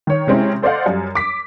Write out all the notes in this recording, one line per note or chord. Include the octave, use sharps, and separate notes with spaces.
D#3 C#5
C3 G#3 C4 C#4 E4
A4 C5 D5 D#5 F5 F#5
F#2 G3
D6 B6